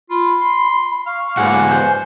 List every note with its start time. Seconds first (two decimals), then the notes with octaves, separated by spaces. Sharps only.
0.10 F4 B5
0.42 C6
1.07 F5 C#6
1.37 G#2 A#3 B3 F#5 G#5
1.70 C5